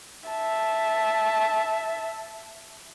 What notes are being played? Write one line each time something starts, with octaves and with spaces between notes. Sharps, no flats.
E5 A5